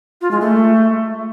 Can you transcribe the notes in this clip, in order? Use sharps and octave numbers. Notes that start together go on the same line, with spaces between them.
F4
G#3
A3